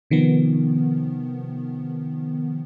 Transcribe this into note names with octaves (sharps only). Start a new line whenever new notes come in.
C3 D#3 F3 B3